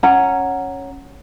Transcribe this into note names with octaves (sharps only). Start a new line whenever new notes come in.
C#4 F#5 A#5